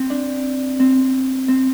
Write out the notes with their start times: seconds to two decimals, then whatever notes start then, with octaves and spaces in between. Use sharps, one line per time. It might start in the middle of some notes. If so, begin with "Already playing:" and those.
Already playing: C4
0.10 D4
0.80 C4
1.48 C4